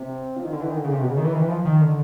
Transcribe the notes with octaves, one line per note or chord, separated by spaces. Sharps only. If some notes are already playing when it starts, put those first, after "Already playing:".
Already playing: C3
F3
D#3
D3
E3
D#3
D3
C#3
C3
B2
C#3
D#3
E3
D#3
E3
F3
D#3
D3